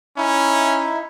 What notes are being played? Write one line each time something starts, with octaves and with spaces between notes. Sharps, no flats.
C#4 D#4 E4 E5